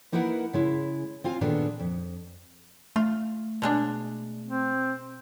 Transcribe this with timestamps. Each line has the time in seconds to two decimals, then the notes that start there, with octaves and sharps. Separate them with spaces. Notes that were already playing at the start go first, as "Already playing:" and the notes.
0.12 A#3 D#4 E4 A#4 B4 F#5
0.53 C#3 G#3 E4
1.24 C4 F4 F5 G#5
1.41 A#2 D#3 B3 D4 G#4 A4
1.79 F2
2.96 A3 F4
3.62 B2 G#3 D4
4.47 C4